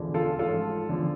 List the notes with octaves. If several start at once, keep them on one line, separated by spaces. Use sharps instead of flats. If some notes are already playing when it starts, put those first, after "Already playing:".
Already playing: E1 E2 D3 F3
F4 A4
A1 G#2 F3 F4 A4
E2 D3 F3